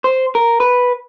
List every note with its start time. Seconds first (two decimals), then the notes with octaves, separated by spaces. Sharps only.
0.04 C5
0.35 A#4
0.60 B4